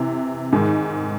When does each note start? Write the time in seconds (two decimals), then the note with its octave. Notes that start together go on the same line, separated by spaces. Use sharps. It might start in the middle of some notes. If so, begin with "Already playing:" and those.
Already playing: C3 E3
0.53 G#2 D#3 G#3